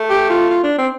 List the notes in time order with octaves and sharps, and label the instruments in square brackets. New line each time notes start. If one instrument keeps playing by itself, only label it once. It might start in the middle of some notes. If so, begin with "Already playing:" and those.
Already playing: [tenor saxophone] A3
[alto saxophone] G4
F4
F4
D4
C4